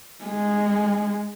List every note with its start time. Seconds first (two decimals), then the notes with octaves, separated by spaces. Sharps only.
0.24 G#3